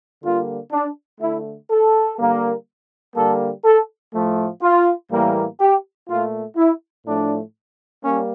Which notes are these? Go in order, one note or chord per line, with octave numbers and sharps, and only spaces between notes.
D3 G3 A#3 F4
D4
D3 A3 E4
A4
D3 G3 A#3
D3 G3 A#3 A4
A4
A2 F3 A3
F4
A2 E3 G3 A#3
G4
A#2 A3 F4
E4
A2 F3 A3 D4
G3 A#3 C#4